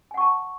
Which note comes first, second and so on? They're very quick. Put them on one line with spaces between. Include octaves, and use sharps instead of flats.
G#5 F#5 C#6 A5